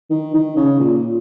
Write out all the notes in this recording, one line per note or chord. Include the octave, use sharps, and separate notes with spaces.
D#3
D#3
C#3
A#2